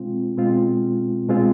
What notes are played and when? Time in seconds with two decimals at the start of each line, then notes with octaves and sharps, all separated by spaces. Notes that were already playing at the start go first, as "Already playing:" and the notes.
Already playing: B2 G#3 C4 F4
0.37 B2 G#3 C4 F4
1.28 B2 G#3 C4 F4